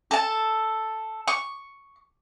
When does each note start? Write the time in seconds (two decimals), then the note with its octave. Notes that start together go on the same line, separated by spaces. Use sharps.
0.11 A4 A5
1.28 C#6